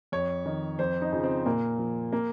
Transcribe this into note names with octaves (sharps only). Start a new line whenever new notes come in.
F2 C#5
D#3
F2 C5
D#4
C#3 F3
C4
A#2 A#3
F3
A#3